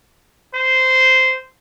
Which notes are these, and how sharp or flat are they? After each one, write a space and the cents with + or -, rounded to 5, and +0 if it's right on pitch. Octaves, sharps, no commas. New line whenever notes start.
C5 -10